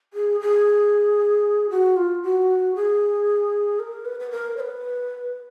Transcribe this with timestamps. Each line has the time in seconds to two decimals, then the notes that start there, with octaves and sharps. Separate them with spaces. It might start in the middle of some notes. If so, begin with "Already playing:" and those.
0.13 G#4
0.40 G#4
1.70 F#4
1.96 F4
2.22 F#4
2.75 G#4
3.79 A#4
4.05 B4
4.20 B4
4.31 A#4
4.57 C#5
4.60 B4